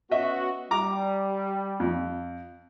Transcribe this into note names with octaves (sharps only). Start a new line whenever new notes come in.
B3 C#4 F#4 D#5 E5
G3 A#5 D6
F2